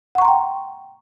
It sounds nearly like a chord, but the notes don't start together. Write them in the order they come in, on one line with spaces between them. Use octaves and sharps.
F#5 C#6 A#5 C6 G5